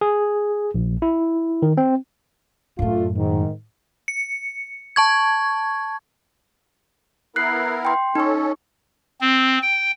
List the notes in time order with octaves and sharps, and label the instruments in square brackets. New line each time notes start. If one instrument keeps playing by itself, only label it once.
[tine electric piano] G#4
A#1
E4
D#3
C4
[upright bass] F#2 A2 [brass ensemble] A3 D4 F4
[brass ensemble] G#2 D#3
[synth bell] C#7
A5 C#6 G#6
[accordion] B3 E4 A#4 [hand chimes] F#6 C7
[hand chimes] G5 C6
[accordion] C#4 A4 [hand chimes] D#4 C#6
[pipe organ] C4
G5